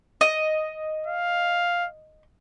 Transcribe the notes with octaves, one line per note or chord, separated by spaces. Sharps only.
D#5
F5